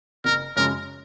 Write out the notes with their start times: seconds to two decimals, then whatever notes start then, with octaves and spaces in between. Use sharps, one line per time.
0.25 F#1 A#4
0.56 F#2 C#3 F3 G#3 A#4